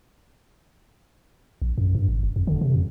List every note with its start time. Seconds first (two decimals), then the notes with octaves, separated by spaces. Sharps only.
1.62 A#1
1.78 F#2
1.95 G2
2.09 G#1
2.23 F1
2.36 F2
2.47 D3
2.61 C3
2.74 F2